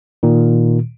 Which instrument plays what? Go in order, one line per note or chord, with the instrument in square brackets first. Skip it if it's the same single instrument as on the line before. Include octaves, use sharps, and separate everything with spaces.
[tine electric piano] A#2 D#3